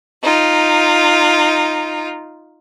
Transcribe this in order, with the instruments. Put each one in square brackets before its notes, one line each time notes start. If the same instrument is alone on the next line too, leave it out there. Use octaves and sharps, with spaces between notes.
[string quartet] D#4 F4